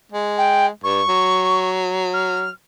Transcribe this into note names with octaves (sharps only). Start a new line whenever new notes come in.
G#3
G5
G2 C#6
F#3
F6